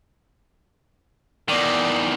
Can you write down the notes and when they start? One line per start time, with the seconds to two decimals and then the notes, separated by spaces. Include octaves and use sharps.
1.48 E2 D#3 D5